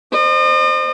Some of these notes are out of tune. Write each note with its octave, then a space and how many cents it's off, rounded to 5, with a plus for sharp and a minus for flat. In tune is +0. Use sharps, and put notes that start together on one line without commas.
C5 +0 D#5 -40